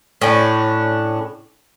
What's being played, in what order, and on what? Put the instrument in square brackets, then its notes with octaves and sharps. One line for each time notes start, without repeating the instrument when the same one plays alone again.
[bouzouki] A2 C#4 D4